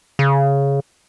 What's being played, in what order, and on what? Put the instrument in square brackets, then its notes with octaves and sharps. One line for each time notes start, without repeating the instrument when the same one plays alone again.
[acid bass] C#3